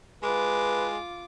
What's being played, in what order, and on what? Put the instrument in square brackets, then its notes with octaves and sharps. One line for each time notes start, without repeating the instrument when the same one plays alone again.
[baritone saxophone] G#3 [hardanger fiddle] F4 D6 [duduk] B4